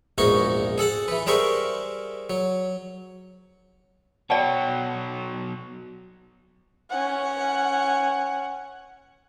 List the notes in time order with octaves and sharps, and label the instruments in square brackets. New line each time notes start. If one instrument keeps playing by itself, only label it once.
[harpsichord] A#1 E2 G#2 D#4 F#4 C#6
G#4 A4 F#5 A5
E3 B4
G3 G#4 A#4 C5 E5 C#6
F#3
[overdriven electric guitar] B2 F#3 [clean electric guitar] C#5 F#5 G5 [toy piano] D5 A5
[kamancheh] C#4 F#5